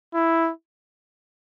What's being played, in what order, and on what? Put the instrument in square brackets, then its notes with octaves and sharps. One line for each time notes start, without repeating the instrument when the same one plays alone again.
[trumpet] E4